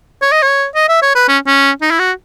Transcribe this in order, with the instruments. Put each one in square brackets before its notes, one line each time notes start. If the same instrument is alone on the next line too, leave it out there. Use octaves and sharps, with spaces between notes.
[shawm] C#5
D#5
C#5
D#5
E5
C#5
B4
C#4
C#4
D#4
E4
F#4